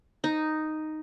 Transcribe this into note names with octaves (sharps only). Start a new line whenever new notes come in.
D#4